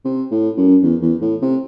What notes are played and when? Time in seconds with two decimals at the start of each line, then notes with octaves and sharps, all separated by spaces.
0.05 C3
0.31 A2
0.57 F#2
0.83 E2
1.02 E2
1.22 A2
1.42 C3